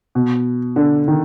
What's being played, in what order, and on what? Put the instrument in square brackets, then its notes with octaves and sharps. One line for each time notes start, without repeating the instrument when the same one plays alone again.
[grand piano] B2
D3
D#3